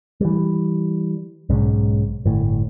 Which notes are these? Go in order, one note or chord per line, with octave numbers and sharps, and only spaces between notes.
E3 G3
B1 G#2 C#3
G1 A2